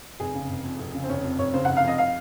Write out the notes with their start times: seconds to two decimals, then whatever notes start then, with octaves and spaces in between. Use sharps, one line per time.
0.20 F1 G#4
0.35 C#3
0.49 F1
0.64 F2
0.79 F1
0.94 C#3
1.04 C4
1.09 F1 C#4
1.24 F2
1.39 F1 C#5
1.54 C#3 C5
1.65 F1 F#5
1.77 F5
1.84 F2 D#5
1.98 F5